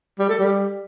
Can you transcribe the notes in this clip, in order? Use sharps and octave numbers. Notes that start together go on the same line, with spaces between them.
G3
A4
G3